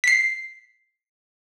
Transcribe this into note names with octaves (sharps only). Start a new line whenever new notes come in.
B6 C7